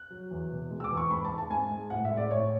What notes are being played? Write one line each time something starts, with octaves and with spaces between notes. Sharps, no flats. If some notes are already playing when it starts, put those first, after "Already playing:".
Already playing: F#6
F#3
E2
B2
G#3
E6
D6
E2
C#6
G#2 B5
A5
G#3
A5
G#2 G#5
G#3
A2 F#5
E5
G#3
D5
A2 C#5